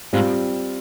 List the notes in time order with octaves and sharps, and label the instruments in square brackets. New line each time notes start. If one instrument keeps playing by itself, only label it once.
[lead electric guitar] G#2 [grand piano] G3 C4 F4